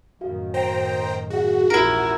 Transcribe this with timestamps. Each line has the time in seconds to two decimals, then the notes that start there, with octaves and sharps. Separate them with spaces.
0.21 F#2 A2 D#3 F#4 F5
0.54 C5 G5 A#5
1.30 F#4 G#4 F5 F#5
1.70 A#1 E2 G#2 C#4 E4 F4 G4 A#4